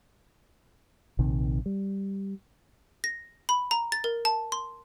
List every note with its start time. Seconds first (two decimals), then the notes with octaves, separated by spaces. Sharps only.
1.19 A#1 C3 D#3
1.66 G3
3.04 A#6
3.49 B5
3.71 A#5
3.92 A6
4.04 A#4
4.25 A5
4.52 C6